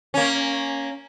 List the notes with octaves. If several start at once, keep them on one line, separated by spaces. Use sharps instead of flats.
A#3 C#4